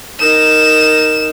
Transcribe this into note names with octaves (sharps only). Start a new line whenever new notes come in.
D#4 A#4 E7